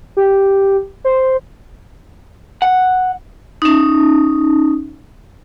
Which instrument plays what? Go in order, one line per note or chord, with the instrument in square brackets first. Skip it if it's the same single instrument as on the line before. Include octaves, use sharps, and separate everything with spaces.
[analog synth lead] G4
C5
[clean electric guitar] F#5
[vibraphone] C#4 D#4